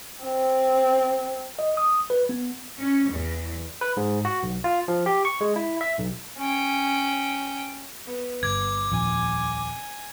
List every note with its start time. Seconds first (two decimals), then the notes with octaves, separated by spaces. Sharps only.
0.24 C4
1.59 D#5
1.77 D#6
2.10 B4
2.29 B3
2.78 C#4
3.10 E2
3.81 B4
3.97 G#2
4.25 F#4
4.43 B1
4.64 F4
4.88 F3
5.06 G4
5.25 C#6
5.41 G#3
5.56 E4
5.81 E5
5.98 B1
6.38 C#4 G5
8.06 B3
8.43 G1 D6 G#6
8.92 D#1 A#1 F2 G#5